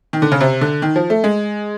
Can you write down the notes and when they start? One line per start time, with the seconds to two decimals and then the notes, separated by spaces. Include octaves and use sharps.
0.13 D#3
0.22 D3
0.32 C#3
0.41 C3
0.61 D3
0.82 D#3
0.96 F3
1.10 A3
1.24 G#3